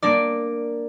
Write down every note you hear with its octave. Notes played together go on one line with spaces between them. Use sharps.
A#3 D4 A#4 D5